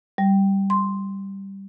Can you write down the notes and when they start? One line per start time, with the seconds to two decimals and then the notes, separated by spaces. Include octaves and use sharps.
0.18 G3
0.70 C6